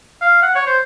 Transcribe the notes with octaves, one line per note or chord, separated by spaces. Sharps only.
F5
F#5
C#5
C5